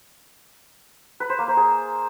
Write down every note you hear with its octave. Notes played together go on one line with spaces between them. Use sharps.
B4
C5
A#3
C5
G#4